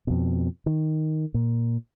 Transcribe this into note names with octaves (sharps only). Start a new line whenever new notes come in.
F2 B2
D#3
A#2